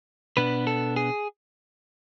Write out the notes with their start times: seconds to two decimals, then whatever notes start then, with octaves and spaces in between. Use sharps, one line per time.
0.37 B2 B3 D4 B4
0.67 A4
0.96 G#4